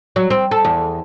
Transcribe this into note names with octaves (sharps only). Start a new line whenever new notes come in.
F#3
C4
A4
E2